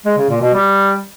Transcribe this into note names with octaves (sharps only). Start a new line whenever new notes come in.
G#3
C#3
A#2
B2
G3